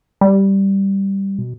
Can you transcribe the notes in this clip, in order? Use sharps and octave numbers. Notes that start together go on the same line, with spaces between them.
G3
B2